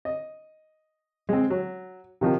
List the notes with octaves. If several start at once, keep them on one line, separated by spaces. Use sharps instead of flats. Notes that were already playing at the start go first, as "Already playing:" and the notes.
D#5
G#3 C4
F#3
C3 D#3 F3